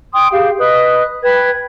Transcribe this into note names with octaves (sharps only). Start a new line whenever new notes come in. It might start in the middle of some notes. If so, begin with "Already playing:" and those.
G5 C6 D#6
G4 G#4 F5
B4 D#5 D#6 F#6
B4 G5 G#6